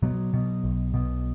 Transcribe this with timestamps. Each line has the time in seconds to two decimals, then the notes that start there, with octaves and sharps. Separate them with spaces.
0.03 B2 F#3
0.34 B2
0.64 B1
0.94 B2